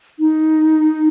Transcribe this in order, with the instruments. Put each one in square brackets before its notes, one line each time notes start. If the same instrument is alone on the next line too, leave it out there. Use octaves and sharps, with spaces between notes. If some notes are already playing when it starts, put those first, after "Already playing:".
[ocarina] D#4